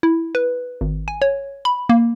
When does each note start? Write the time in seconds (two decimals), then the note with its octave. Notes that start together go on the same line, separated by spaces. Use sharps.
0.03 E4
0.35 B4
0.81 G#1
1.08 G#5
1.22 C#5
1.65 B5
1.89 A#3